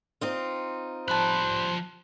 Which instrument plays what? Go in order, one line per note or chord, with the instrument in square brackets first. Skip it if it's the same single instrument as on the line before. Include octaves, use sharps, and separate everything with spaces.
[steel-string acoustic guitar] C4 D#4 F4
[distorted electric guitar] F3 B5 [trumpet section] G3 C5 [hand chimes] A5 F#6